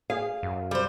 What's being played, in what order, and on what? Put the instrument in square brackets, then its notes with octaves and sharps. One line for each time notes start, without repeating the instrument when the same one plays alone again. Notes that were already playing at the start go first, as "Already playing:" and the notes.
[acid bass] G#4 [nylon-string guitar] F5
[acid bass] F#2
[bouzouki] G3 C5